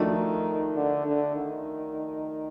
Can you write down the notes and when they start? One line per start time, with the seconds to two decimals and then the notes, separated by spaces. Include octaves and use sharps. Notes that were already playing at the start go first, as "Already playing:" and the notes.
Already playing: D#3 F3 A3 D4 F#4
0.76 D3
1.06 D3
1.35 D#3